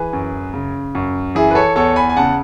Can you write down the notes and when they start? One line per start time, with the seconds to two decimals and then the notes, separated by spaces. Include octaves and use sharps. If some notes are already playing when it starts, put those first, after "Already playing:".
Already playing: E3 G#4 B4
0.13 F#2
0.54 C#3
0.95 F#2
1.35 E3 E4 G#4
1.51 B4
1.55 A4 C#5
1.76 E2 A4 C#5
1.96 G#5 B5
2.09 G#5
2.16 C#3 F#5 A5